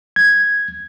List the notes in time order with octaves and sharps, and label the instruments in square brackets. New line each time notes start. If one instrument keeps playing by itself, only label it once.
[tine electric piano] G#6